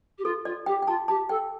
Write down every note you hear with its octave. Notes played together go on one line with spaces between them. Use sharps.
G4
F4 A4
F4 D5
G4 G5
G5
F4 A5
G4 A5
A4 G5